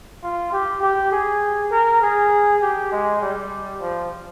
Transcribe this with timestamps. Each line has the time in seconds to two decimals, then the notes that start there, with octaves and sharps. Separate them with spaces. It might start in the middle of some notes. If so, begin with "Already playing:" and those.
0.23 F4
0.52 G4
0.83 G4
1.12 G#4
1.71 A#4
2.02 G#4
2.62 G4
2.92 G#3
3.21 G3
3.81 F3